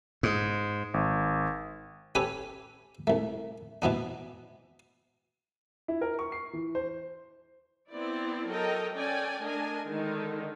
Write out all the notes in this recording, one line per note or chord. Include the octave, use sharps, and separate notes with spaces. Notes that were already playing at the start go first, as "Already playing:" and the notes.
G#2
G#1
C#4 G4 A4 B4 G#5
C2 A3
B2 E3 B3 D4
E4
A#4
C#6
C7
E3
C5
B3 C4 E4 D5
F#3 A4 A#4 D#5 G5
C#4 A4 D5 G5 G#5
A3 D4 A#4 D#5 G#5
D3 D#3 G#3 D#4